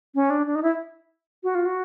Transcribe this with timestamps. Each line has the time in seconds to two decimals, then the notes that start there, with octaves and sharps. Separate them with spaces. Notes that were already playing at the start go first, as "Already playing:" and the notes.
0.15 C#4
0.30 D4
0.47 D4
0.55 D#4
0.63 E4
1.43 F#4
1.55 F4
1.65 F#4